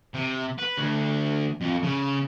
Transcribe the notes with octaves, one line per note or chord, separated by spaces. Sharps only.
C3
B4
D2
F2
C#3